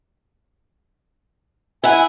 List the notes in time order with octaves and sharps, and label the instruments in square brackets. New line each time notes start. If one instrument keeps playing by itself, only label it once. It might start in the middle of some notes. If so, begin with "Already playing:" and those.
[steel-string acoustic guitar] E4 F#5 [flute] G#5